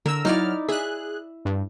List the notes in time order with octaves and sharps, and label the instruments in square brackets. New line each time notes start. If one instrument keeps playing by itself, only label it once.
[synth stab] D3 E6 [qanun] A#4
[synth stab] F#3 F6 [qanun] D#4 E4 D5
[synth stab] G#4 F#6 [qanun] E5
[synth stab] G2